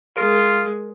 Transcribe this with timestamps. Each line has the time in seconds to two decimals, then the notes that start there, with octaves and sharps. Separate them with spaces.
0.17 G#3 F4 A#4